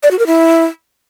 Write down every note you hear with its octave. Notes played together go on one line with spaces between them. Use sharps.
D5
F#4
A#4
E4